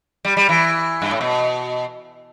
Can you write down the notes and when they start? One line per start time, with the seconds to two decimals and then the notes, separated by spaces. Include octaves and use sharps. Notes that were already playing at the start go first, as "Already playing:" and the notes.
0.25 G3
0.37 G3
0.49 E3
1.02 G2
1.11 A2
1.21 B2